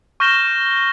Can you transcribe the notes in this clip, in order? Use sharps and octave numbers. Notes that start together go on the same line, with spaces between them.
C#6 F6 G6 A#6 E7 G7